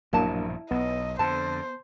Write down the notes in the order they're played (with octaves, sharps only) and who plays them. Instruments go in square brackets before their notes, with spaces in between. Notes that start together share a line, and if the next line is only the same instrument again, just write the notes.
[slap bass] A#1 G2 B2 [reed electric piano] F#3 A#3 D4 [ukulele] E4 A5
[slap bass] B1 [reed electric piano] B3 [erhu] D#5
[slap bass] F2 D3 [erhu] C5 [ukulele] A5